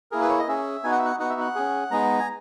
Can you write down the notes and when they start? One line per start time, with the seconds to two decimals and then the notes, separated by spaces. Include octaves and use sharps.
0.12 A#3 E4 G#4 A#4
0.21 B4
0.29 C#5
0.39 D#5
0.48 C#4 G#4 E5
0.84 B3 D#4 F#4 G#5
0.92 F#5
0.99 E5
1.05 F#5
1.19 B3 D#4 F#4 F#5
1.30 E5
1.41 F#5
1.55 C#4 G#4
1.91 G#3 B3 D#4 G#4 A#5
2.19 G#5